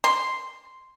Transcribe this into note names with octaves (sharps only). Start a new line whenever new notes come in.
C6